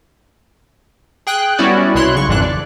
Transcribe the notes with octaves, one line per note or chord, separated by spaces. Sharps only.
G#4 G5 F#6
G3 B3 C#4 E4 F#4 D5
C2 B2 E4 C#5 C6 F#6
B1 C#3 C#6
G#1 F2 G#2 E3 D4 F#6
D5